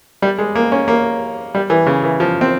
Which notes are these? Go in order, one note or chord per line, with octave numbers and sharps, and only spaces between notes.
G3
G#3
A#3
C#4
A#3
G3
E3
C#3
E3
F3
C4